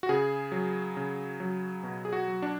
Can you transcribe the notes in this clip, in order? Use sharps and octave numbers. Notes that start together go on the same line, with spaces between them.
F#4
C#3 G#4
F#3
C#3
F#3
B2
G#4
F#4
F#3
D4